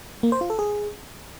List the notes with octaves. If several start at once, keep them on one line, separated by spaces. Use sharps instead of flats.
A#3
C5
F4
A4
G#4